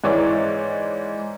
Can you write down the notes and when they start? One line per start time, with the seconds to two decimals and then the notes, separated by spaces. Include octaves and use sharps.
0.04 G#2 E3 C#5 D5